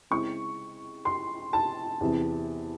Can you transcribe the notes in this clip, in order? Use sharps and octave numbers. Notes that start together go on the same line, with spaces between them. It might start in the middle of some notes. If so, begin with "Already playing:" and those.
C#3 G#3 C4 E4 C#6
C6
A5
E2 C3 E3